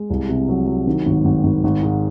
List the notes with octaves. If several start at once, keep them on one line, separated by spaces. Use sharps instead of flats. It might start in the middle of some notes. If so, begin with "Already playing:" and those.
Already playing: G#3
C2
C3
F#3
F#3
D#3
G#1
G#1
G#1
G#1
G#2